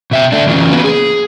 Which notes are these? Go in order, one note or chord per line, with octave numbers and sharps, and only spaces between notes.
B2 E5 G5
A3 D4
C#3 E3 C#4 F4
F#3 A#3 B3 B4
G#4